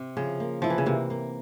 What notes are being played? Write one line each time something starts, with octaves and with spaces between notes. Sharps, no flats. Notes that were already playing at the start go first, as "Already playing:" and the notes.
Already playing: C3
C#3 F3
A#3
F3 E4
E3
C#3
C3 A#3
A#3